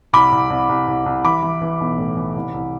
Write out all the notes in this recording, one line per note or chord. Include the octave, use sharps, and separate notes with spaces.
C2 B5 D6
C2
C2
C2
C2
C2
E3 B5 D6
E3
E3
B1
A2
E3
C2
C2